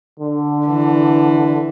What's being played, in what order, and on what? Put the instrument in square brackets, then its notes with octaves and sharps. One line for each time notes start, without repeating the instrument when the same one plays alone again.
[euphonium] D3
[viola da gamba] E3